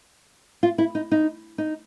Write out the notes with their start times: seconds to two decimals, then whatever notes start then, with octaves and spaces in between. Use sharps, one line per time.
0.63 F4
0.78 E4
0.95 D#4
1.12 D#4
1.58 D#4